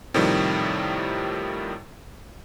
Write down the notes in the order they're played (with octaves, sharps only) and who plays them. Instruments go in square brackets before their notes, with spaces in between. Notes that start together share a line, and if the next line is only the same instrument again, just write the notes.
[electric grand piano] A2 C3 D#3 F3 G3